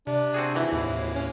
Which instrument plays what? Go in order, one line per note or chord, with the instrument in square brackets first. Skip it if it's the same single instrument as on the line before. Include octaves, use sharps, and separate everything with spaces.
[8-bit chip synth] C3 [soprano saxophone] D4
[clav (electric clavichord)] C4 F#4 G#4
[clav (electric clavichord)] G#1 E3 [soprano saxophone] E4
[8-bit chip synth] D#2 A2
[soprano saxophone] C#4